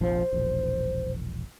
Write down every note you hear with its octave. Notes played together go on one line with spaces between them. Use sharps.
F1 A#1 F3 C5
E1 A#1